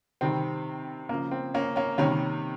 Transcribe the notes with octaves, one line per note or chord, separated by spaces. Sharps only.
C3 D#3 G3 C4
C#3 F3 A#3
C4
A#3 C#4
A#3 C#4
C3 D#3 G3 A#3 C#4